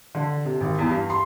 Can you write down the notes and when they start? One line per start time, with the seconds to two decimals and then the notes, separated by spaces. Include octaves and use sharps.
0.15 D3
0.45 C3
0.60 G#1
0.78 E2
0.90 G2
1.10 C6